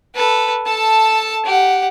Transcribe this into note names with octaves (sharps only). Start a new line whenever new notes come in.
A4 B4
A4 A5
G4 F#5